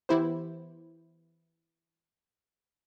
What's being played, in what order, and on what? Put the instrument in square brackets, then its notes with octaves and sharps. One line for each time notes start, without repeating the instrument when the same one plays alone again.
[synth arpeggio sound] E3 B3 E4 G4 C5